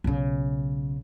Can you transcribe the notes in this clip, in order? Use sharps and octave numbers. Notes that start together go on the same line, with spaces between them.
B1 C#3